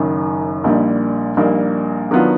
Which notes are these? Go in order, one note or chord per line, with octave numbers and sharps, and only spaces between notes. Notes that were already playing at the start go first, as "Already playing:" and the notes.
Already playing: F#1 F#2 D#3
A#1 A#2 G3 A#3 D#4
A#1 A#2 G3 A#3 D#4
D#3 F#3 B3 D4 F4